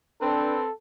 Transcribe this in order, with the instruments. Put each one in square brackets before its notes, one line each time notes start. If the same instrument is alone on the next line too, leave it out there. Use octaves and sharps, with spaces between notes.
[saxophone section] C4 B4 [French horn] D4 [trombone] A4